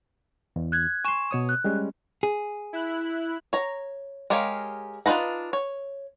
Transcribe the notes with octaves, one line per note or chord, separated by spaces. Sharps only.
E2
F#6 G#6
G#5 C6 C#6 E7
B2 C#5 D#6
F#6
G3 G#3 C#4
G#4
E4 F#6
C#5 A#5
G#3 G4 A#4 C#5 F5
D4 D#4 F4 B4 A#5
C#5